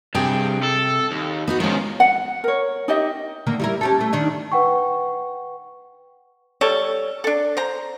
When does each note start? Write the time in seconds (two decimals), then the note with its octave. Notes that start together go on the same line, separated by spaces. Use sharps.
0.15 G2 C3 G#4 G5
0.63 A4
1.11 D#2
1.48 B3 D#4 F#4
1.60 D#3 F3 G#3 C#4
2.00 F#5
2.44 A#4 C#5
2.88 D#4 G4 D#5 E5
3.47 D3 D#3 A#3
3.60 G3 E4 A#4
3.81 C#4 G4 A4
4.01 A3
4.13 D#3 D4 D#4
4.52 B4 F#5 G5 C#6
6.61 G3 A4 C#5
7.24 D4 A4
7.57 C5 A#5